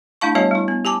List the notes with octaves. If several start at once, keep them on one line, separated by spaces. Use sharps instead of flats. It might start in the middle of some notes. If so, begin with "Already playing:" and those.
A3 D4 E4 F5 A5 C#6
G3 B3 F#4 C#5 D#5 A5
G3 E4
B3
G4 G#5 A5 D6